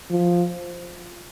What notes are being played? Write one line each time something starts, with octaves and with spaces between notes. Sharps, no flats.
F3